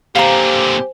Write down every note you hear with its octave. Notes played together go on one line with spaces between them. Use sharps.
A#2 D3 G4 C5 F5 G#5 A#5